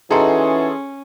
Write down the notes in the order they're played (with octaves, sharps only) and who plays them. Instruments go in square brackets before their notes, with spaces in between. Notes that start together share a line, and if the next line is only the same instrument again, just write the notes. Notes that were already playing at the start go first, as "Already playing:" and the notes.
[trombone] E3 [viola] C#4 [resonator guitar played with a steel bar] D#4 F#4 [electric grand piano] G#4 A4 C6